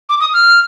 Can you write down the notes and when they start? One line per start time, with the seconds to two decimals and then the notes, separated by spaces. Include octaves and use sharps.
0.09 D6
0.20 D#6
0.34 F6